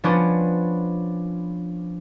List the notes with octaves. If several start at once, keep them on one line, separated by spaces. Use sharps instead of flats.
F3 B3 C#4 D4